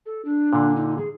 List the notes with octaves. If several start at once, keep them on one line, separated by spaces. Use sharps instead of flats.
A4
D4
A#2 D3
D#4
G#4